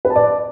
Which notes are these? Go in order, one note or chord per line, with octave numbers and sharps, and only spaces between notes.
B4
A5
D5